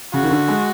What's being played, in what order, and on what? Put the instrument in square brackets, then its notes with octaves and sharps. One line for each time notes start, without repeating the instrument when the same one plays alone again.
[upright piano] C#3 [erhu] F#4
[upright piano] D#3
D3
G#3